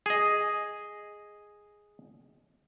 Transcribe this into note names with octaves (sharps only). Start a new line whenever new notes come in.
G#4 D#5